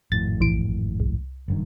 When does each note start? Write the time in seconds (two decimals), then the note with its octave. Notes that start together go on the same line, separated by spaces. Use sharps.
0.12 G#1 F2 A2 A6
0.40 A#1 E3 D7
1.00 C2
1.48 F#1 G2 D#3